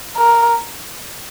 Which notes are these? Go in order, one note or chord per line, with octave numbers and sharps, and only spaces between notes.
A#4